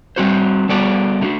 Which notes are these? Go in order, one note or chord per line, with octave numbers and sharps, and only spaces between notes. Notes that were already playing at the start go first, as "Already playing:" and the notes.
G3 C4 F#4 C5
G3 B3 F#4 A4 D5
D3 A3 D4 F#4